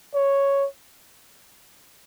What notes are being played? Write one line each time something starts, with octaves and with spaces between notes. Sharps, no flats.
C#5